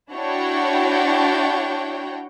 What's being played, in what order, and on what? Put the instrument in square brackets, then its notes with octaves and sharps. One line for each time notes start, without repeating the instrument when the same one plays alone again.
[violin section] D4 E4 F#4 C#5 F#5 G5